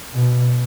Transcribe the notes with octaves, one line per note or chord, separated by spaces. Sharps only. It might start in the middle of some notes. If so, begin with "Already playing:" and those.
B2